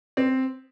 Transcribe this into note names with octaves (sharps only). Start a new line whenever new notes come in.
C4